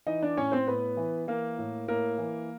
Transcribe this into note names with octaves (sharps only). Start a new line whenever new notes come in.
E3 D#4 D#5
D4 D5
A2 C#4 C#5
C4 C5
A2 B3 B4
E3
E3 A#3 A#4
A2
A2 A#3 A#4
E3